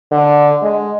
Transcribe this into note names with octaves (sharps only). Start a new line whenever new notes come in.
D3
G#3